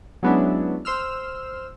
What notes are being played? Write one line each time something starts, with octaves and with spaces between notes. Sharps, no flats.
F#3 G#3 B3 C#4 D4 E4
C5 C6 E6 F6